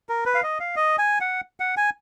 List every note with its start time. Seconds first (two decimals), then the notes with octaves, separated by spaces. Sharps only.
0.09 A#4
0.26 B4
0.35 F5
0.43 D#5
0.60 F5
0.76 D#5
0.99 G#5
1.21 F#5
1.60 F#5
1.77 G#5